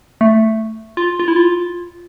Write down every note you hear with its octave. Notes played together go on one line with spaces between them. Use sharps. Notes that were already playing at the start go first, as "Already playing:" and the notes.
A3
F4
F4
E4
F4